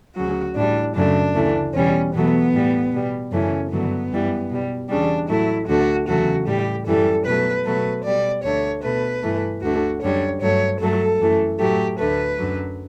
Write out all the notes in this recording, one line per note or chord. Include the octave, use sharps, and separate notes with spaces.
D2 C#3 F#3 F#4
A2 E3 G3 D4
F#2 C#3 F#3 A3 D4
D2 C#3 E3 A3
E2 B2 G3 C#4
E2 B2 F#3 A3 B3
A2 G3
B2 G3
F#2 C#3 E3 A3 C#4
G2 D3 F#3 A3 B3
F#2 E3 G3
B2 G3
E2 C#3 G3 D4
A2 F#3 A3 E4
D2 D3 A3 F#4
E2 C#3 F#3 A3 F#4
A2 G3 G4
F#2 E3 G3 A4
B2 F#3 A3 B4
B2 F#3 A3 B4
B2 G3 D5
D2 D3 A3 C#5
B2 A3 B4
G2 E3 A3
D2 D3 A3 F#4
F#2 D3 G3 C#5
G2 F#3 A3 C#5
G2 F#3 A3 A4
F#2 E3 A3
A2 F#3 A3 G4
D2 D3 A3 B4
F#2 D3 F#3